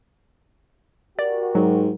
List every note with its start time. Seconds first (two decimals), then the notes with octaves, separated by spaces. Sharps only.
1.19 F#4 G4 A#4 D5
1.55 G#2 F#3